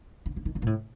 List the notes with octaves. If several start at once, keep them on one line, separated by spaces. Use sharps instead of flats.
D3
D3
D#3
D3
A#2
A2